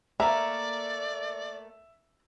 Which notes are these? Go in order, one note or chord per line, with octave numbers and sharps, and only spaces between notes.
A3 A#3 D5 E5 A#5